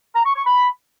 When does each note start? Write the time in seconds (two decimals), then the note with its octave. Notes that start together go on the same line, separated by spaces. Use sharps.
0.15 A#5
0.25 C#6
0.36 C#6
0.46 B5